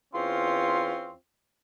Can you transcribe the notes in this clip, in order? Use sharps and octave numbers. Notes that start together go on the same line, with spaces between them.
E2 C4 C#4 F4 C6